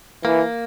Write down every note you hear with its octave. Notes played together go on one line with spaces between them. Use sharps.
E3 A#3